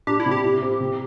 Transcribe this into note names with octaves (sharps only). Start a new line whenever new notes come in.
D4 G4
E4
C3
G4
E4
C4
C3